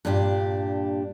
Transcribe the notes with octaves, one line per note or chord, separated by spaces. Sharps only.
G2 A#2 D4 F4 G4